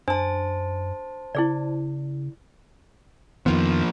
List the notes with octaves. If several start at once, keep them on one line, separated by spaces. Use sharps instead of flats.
F#2 D4 C5 A5
C#3 E4 G#4 D5
F2 D#3 F3 A#3 B3